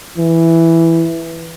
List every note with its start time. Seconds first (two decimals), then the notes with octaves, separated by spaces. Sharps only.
0.18 E3